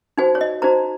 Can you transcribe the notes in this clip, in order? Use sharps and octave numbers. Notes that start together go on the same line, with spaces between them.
D#4 F#4 C5 G#5
C#5
D#5
D#4 F#4 C5 A#5